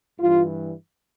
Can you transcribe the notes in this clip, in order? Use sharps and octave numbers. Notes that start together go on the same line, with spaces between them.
G2 E3 F4